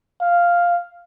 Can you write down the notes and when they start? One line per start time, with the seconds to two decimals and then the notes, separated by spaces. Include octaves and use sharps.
0.21 F5